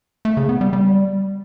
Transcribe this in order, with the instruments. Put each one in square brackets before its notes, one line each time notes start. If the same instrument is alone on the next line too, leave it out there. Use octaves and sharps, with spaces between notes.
[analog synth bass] A3
C#3
B3
G3
G3